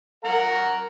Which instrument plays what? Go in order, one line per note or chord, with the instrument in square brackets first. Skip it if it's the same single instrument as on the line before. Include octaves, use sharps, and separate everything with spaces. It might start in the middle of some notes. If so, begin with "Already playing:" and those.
[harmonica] A#4 F#5 A#5